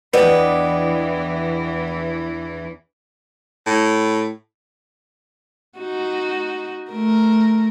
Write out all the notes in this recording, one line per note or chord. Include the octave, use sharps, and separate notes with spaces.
E2 E3 B3 D4 B4 D#5 G5
A2
D#4 F#4
A3 A#4